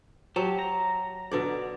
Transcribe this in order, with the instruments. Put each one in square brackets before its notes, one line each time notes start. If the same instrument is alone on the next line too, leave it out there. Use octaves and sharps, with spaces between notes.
[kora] F#3 [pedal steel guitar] G4 A5
[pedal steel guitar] A#5
[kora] B2 D3 D5